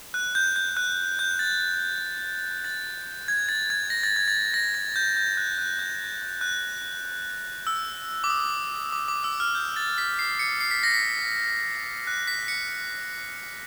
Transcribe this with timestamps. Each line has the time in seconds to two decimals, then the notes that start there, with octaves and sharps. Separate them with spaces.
0.14 F#6
0.35 G6
0.56 G6
0.77 F#6
1.19 G6
1.39 A6
2.64 A6
3.28 G#6
3.49 A6
3.70 G#6
3.90 A#6
4.03 A6
4.16 G#6
4.28 A6
4.54 A#6
4.74 G#6
4.96 G6
5.17 G6
5.37 F#6
5.58 F#6
5.79 G6
6.41 F#6
7.67 E6
8.24 D6
8.30 D#6
8.92 D6
9.08 D6
9.24 E6
9.40 F6
9.55 G6
9.76 A6
9.98 B6
10.19 C7
10.39 C#7
10.61 C7
10.71 B6
10.83 A#6
10.94 B6
12.07 F#6
12.28 B6
12.48 C#7
12.69 C#7